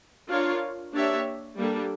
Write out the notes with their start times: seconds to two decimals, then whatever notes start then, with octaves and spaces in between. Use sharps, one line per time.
0.29 D4 F4 A#4 C#5 F5
0.93 A#3 D4 G4 C#5 E5
1.57 G3 A#3 D4 A4